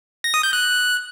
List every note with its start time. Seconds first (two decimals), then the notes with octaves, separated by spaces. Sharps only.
0.24 A#6
0.34 D#6
0.43 G6
0.53 F#6